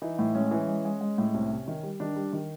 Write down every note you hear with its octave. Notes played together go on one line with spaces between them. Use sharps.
E3 D#4
A2
G#3 C#4
E3
G#3
G#3
G#3
A2
C2
C3
D#3
G3
D#3 D4
G3
D#3